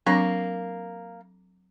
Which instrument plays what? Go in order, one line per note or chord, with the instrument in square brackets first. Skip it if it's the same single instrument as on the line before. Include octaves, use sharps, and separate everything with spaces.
[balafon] F#3 C4 D4 [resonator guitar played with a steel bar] A#3